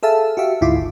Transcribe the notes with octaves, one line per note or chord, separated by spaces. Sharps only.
G#4 A4 E5 F5 A5
F#4 G4 E5 F5
D2 G#2 E4 F4 D6
G#1